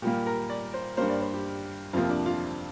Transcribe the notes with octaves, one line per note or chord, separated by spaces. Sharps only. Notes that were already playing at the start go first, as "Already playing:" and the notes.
A#2 G3 A#3 G4
A#4
D5
C5
G2 G3 A#3 C5
D5
C5
G4
F2 C3 F3 A#3 F4
D4
F4